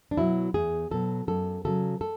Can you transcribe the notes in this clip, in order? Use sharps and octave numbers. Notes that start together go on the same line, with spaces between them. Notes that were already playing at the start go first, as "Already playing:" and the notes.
D4
B2 F#3 E4
E2 G#4
B2 F#3 A4
F#2 A4
C#3 F#3 A4
A4